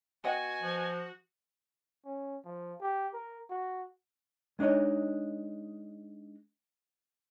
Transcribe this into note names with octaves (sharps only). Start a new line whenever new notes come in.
B3 F#4 D#5 F#5 G#5
F3
C#4
F3
G4
A#4
F#4
G#3 D4 D#4 C#5 D#5